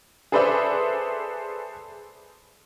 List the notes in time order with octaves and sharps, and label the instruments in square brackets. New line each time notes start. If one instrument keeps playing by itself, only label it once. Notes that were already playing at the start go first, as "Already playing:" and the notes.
[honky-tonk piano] G#4 A4 B4 C5 D5 E5